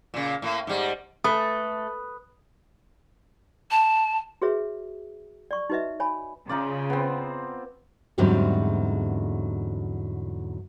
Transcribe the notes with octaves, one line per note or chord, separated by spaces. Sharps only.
A#2 C#3
A2 A#3
G#2 G3
A3 B4 D#6
A5
F#4 G#4 B4 C#5 E5
D5 C#6
D#4 F#4 B4 D#5 E5
C#5 G#5 B5
C#3 D#4 F4 D5
B3 C4
E2 G#2 D3 F#3 G3 C4